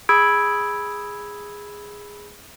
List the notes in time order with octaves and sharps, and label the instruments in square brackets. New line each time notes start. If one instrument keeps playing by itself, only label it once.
[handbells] G#4 B5 E6 G#6 D7